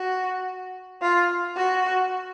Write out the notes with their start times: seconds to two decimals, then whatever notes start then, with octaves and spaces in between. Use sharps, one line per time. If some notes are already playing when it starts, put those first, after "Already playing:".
Already playing: F#4
1.01 F4
1.56 F#4